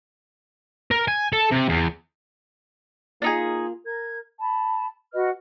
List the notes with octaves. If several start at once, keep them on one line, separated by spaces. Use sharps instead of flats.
A#4
G#5
A4
C3
E2
A#3 D4 D#4 F4 G#4
A#4 G#6
A5 B5
F#4 B4 D#5 F6